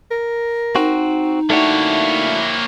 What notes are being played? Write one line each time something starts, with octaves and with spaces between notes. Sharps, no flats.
A#4
C4 D#4 F#4
A3 A#3 D4 E4 F#4 C#5